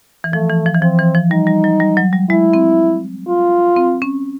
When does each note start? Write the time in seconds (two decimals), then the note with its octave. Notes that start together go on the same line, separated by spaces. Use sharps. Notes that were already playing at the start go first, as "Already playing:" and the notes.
0.24 E3
0.33 F3 A3
0.50 E3
0.66 F3
0.74 E3
0.81 F3 C4
0.99 E3
1.15 F3
1.31 G3 D#4
1.47 G3
1.64 F#3
1.80 G3
1.97 F#3
2.13 G3
2.30 G#3 E4
2.53 C4
3.28 F4
3.76 C4
4.02 C#4